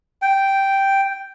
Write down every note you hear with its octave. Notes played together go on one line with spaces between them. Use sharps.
G5